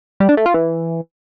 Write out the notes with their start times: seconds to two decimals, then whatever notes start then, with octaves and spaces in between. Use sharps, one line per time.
0.20 G3
0.29 D4
0.37 A3
0.46 F4
0.54 E3